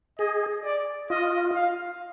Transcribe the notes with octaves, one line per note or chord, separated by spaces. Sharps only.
G#4 D#5
D5
F4 D#5
F5